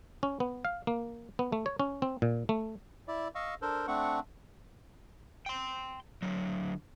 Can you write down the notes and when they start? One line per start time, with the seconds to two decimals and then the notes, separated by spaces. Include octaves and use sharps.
0.23 C#4
0.40 B3
0.65 F5
0.87 A#3
1.39 B3
1.52 A3
1.66 C#5
1.79 C#4
2.02 C4
2.22 A#2
2.49 A3
3.08 E4 D5 E5
3.35 D#5 F5 C#6 E6
3.62 D4 A4 A#4 C5
3.88 A3 C4 D4 F#5 C#6
5.46 G5 C6
6.22 D3 F#3